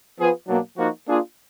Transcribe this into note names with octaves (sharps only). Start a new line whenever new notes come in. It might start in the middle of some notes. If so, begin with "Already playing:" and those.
F3 B3 F4 G#4 B4
B2 F#3 A#3 D4
F3 A#3 D#4 F#4
A#3 D4 F4 G#4